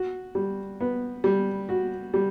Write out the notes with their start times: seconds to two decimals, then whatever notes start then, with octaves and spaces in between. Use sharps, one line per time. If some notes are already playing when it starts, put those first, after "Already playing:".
Already playing: F#4
0.35 G3
0.81 B3
1.24 G3
1.69 F#4
2.14 G3